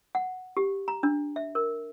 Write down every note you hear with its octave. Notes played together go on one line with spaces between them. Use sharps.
F#5
G4
A#5
D4
E5
A#4